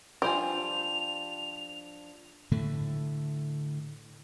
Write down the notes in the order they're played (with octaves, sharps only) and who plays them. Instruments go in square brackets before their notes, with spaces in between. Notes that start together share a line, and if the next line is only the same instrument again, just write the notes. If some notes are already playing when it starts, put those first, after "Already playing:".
[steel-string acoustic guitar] F3 D4 F4 [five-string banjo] G3 C5 G#5 [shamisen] G4 [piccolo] F7
[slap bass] A2 D3 A3